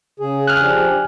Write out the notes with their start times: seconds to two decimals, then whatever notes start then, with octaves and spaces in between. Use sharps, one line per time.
0.20 C#3 G#4
0.47 G#5 F6 F#6
0.61 F3 D4 G4